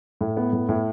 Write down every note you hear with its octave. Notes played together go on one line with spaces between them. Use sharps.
A2
B3
A2
A2